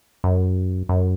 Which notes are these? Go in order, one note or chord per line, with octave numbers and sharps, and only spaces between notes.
F#2
F#2